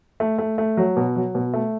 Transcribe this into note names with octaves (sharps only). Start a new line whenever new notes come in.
A3
A3
A3
F#3
B2
F#3
B2
A3